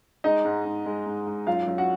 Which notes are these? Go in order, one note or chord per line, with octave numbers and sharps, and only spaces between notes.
G#3 D#4 D#5
G#2
G#2
G#3
G#2
G#2
F#2 F4 F5
F#2
F#4 F#5